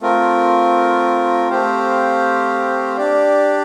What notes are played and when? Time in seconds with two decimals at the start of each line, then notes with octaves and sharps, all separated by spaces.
0.01 A3 C4 F4 A#4
1.49 A3 C4 G4 C5 F5
2.97 D4 G4 D5